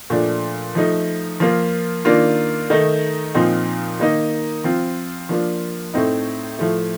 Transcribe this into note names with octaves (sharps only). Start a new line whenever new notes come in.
A#2 F3 A3 D4
F3 A3 D#4
F3 A#3 F4
D#3 A#3 D4 F4
D#3 A3 D#4
A#2 F3 C4 D#4
D#3 A#3 D#4
F3 C4 F4
F3 A#3 D4 F4
A2 A3 C4 D#4
A2 F3 A3